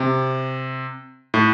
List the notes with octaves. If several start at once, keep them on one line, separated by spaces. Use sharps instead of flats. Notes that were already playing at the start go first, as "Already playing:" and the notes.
Already playing: C3
A2